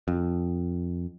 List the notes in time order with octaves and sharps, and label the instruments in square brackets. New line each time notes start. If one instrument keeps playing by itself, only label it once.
[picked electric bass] F2